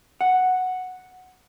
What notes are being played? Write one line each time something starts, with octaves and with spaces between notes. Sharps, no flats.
F#5